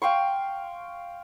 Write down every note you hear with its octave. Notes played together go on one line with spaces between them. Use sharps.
F5 G5 C6 C#6